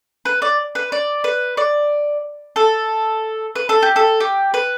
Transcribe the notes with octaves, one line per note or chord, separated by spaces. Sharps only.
B4
D5
B4
D5
B4
D5
A4
B4
A4
G4
A4
G4
B4